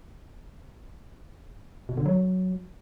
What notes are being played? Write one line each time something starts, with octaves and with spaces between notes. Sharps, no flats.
B2
D3
F#3